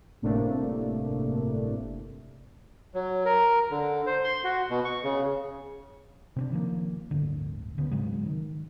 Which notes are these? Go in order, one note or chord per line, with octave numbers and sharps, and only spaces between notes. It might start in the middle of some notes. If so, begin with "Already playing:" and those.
G1 A2 C3 A3 A#3 D4
F#3
A#4
D3
C5
C6
F#4
B2
C#6
C#3
C3 C4 D4
D#3 F3 A#3
D1 G1 D3
D2 C#3 B3
G#2 C#3 F#3 G#3
D#3